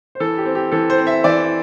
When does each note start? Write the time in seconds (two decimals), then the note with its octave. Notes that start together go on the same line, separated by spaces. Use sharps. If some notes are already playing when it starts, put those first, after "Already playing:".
0.15 C5
0.20 E3 A4
0.37 G4
0.46 C4
0.55 G4
0.72 E3 A4
0.90 C5
0.98 C4
1.07 E5
1.24 E3 D5